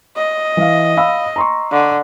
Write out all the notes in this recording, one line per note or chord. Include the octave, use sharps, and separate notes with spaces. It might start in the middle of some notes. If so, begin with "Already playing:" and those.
D#5
E3 F5
F5 B5 E6
A#5 C6 C#6
D3